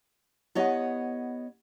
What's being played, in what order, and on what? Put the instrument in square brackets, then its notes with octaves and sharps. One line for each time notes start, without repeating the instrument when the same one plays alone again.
[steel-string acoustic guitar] B3 C#5 D#5 [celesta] E4 G4 F#5